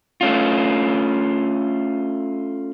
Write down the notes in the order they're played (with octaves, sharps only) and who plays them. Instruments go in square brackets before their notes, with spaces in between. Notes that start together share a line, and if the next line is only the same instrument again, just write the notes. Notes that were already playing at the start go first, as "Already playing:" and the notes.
[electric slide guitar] A3 C#4 F4